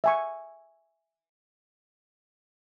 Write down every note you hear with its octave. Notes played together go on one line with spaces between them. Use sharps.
E5 G#5 C#6